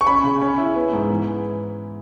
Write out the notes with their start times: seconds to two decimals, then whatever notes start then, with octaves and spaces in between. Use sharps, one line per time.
0.01 C#6
0.07 C#4 B5
0.23 C#3
0.42 C#4
0.58 E4
0.75 B3
0.93 G#2
1.10 E3